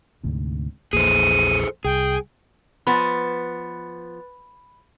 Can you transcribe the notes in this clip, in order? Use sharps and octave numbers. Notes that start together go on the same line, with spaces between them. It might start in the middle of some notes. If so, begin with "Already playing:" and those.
D2 G#2 C3
A#1 E2 A#3 G#4 A4 C5 D#7
C2 G#4 G5
F3 B3 B4 B5 A6